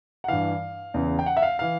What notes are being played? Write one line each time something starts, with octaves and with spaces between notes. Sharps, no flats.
F#5
G2 E3 F5
E2 C#3 E3
G5
F#5
E5
F5
E3 F5